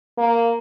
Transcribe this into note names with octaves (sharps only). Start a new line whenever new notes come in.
A#3